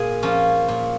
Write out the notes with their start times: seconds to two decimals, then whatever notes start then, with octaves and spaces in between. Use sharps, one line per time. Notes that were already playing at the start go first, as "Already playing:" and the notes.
Already playing: A#2 G#4
0.23 F3 A#3 C#4
0.68 A#2